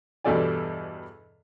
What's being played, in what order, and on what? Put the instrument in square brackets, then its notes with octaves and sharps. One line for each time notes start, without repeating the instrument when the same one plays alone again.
[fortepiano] E2 G2 B2 A4 D5 G#5